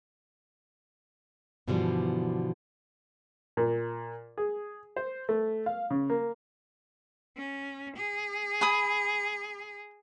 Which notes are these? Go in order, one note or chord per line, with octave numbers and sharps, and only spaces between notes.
G2 B2 D3 E3 F3 G3
A#2
G#4
C5
A3
F5
C#3
A#3
C#4
G#4
G#5 B5 D#6